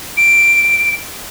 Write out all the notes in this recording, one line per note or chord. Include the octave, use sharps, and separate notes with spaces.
D7